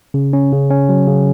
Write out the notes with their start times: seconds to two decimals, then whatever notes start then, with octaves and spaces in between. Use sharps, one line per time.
0.14 C#3
0.33 C#4
0.53 C#3
0.70 C#4
0.89 F#3
1.07 C#3